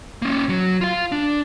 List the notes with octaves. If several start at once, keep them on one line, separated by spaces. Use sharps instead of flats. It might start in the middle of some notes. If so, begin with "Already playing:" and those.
A#3 C#4
F#3
F4 F5
D4